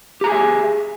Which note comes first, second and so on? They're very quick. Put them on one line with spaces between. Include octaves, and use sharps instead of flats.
G4 A#5 G#4 G#5 E5